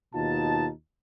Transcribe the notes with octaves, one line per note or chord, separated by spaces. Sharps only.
D#2 B2 D#4 F4 A5